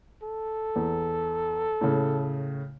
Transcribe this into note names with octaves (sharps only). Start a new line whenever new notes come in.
A4
E2
A2 C#3